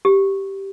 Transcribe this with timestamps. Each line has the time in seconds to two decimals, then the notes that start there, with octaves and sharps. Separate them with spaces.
0.05 G4